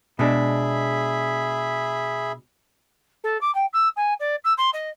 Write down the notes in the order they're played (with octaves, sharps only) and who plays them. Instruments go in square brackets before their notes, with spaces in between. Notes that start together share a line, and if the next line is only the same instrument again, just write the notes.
[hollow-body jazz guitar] B2 G#3 D4 [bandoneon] G#4 E5 B5
[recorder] A4
D6
G5
E6
G#5
D5
E6
C6
D#5